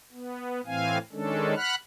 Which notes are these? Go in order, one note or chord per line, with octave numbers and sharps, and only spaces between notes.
B3
A2 E3 C4 F5 G#5
D#3 G#3 C#4 D4 A4
F#5 B5 F6 F#6